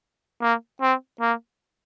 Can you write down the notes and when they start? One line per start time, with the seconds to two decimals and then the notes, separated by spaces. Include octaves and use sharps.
0.42 A#3
0.82 C4
1.21 A#3